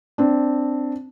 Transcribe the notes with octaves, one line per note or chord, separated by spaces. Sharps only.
C4 D4